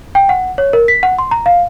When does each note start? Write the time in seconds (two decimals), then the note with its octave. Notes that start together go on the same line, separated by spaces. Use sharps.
0.15 G5
0.29 F#5
0.58 C#5
0.73 A#4
0.88 B6
1.03 F#5
1.18 C6
1.31 A#5
1.46 F5